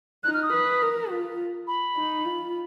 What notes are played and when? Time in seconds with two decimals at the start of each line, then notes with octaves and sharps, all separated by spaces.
0.24 D#4 F#6
0.34 F6
0.43 D#6
0.53 B4
0.81 A#4
1.10 F4
1.67 B5
1.97 D#4
2.25 F4